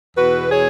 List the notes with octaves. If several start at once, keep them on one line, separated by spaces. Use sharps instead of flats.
E2 B2 F#4 B4
G#4 C#5